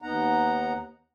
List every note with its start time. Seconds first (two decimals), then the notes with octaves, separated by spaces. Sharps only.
0.02 D#2 B3 D#4 F#5 A#5